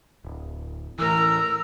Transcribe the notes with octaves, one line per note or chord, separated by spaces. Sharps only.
D1
A2 E3 A#4 A#5 E6